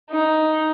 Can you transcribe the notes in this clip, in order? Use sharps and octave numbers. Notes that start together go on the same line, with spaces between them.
D#4